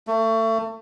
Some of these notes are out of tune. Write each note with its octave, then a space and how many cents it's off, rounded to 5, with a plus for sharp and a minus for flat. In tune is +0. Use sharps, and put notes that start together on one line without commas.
A3 +30